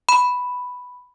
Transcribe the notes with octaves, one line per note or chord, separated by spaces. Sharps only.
B5